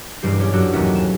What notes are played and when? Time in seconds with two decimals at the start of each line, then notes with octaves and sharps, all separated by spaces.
0.22 E1 G2 G3 G4 C7
0.40 C#4 G4 C#5
0.53 F#2 F#3 D4 F#4 G4 E6
0.73 E1 A1 D#2 A3 C#4 B6
0.95 E7